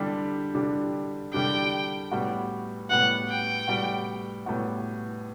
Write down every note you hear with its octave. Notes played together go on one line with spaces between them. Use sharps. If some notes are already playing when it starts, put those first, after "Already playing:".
Already playing: D3 G3 D4 G4
D3 G3 D4 G4
D3 G3 D4 G4 G5
A2 G3 B3 F#4
A2 G3 B3 F#4 F#5
G5
A2 G3 B3 F#4
A2 G3 B3 F#4